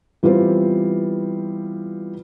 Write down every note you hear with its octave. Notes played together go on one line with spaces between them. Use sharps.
E3 G3 B3 C4 F4